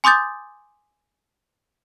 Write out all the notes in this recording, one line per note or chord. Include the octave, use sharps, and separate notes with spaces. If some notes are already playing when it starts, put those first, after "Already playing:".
G#5 C6 D6 D#6 G6 A6